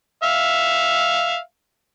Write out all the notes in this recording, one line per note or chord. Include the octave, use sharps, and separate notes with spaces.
E5 F5